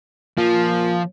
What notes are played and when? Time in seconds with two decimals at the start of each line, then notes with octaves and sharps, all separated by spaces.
0.38 A#2 F3